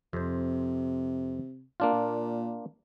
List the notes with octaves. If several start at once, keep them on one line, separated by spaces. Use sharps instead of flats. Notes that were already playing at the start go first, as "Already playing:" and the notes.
F2 C3 C5
A#3 D4 F4
A#2